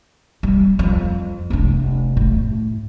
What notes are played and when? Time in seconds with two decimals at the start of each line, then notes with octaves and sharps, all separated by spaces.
0.43 G3
0.79 F2
1.50 F1 D4
2.17 A2